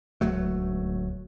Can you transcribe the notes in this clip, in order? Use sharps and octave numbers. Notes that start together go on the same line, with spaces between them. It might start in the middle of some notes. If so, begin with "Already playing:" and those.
D1 C#2 F#3 A3